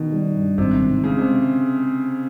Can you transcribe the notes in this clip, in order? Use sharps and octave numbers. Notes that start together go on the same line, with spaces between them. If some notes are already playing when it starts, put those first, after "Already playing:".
Already playing: B2 D#3
G3
G2
G#1 C3
D#3
C#3 G#3
C3